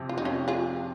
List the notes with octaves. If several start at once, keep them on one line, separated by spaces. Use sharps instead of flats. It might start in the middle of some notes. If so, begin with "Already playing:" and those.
Already playing: F2 C3
F4
D#4
C#4 F4
F4 G#4